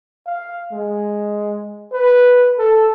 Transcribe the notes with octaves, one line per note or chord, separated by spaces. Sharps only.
F5
G#3
B4
A4